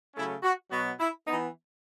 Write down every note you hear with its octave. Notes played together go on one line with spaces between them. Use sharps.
C#3 F#3 A3 C#4 E4
F#4
B2 F#3 B3 F#4
E4
E3 B3 D#4